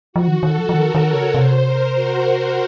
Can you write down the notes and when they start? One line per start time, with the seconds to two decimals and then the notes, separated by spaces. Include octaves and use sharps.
0.13 F3 F#4
0.28 D#3
0.43 D#3 A4
0.58 F3
0.69 F3
0.74 D#3 A#4
0.95 D#3
1.04 C#5
1.14 C#3
1.34 C3 C5
1.65 A#4
1.95 F#4